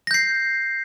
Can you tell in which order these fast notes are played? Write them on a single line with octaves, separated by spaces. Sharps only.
A#6 G6 C7